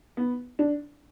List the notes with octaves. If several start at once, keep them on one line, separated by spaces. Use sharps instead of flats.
B3
D4